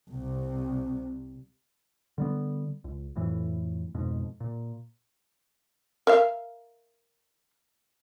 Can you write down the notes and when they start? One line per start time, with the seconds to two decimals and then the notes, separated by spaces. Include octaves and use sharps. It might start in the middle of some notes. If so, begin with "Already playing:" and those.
0.10 C2 C3
2.18 D3 G3 B3
2.84 C#2
3.16 F2 A2 E3
3.95 F2 G#2 B2
4.40 A#2
6.07 A#4 E5 F5